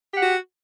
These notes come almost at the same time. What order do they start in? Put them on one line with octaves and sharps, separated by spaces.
G4 F#5 F#4